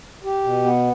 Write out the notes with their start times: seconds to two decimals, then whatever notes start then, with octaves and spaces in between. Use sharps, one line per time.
0.24 G4
0.44 B2
0.64 B3